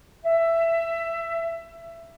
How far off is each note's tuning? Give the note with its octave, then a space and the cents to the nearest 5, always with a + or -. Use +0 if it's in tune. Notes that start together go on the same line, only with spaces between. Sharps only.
E5 +15